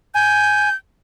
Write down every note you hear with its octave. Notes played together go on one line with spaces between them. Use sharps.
G#5 G6